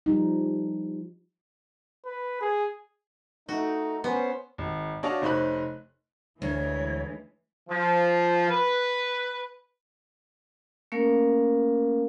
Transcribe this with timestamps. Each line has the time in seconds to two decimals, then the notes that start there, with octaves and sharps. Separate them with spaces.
0.06 F3 G3 D#4
2.05 B4
2.41 G#4
3.49 A3 D#4 F#4
4.04 B3 C#4 C5
4.58 G#1
5.03 D4 F#4 C#5 D#5 F5 A5
5.22 F1 D#4 C5 C#5 B5 F#6
6.42 D2 E3 G#3 C#5
7.70 F3
8.50 B4
10.92 A3 A#3 C#4 A#4 F5